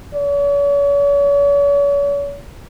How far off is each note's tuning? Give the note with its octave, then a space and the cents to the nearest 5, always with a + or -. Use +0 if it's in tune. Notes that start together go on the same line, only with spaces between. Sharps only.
C#5 +40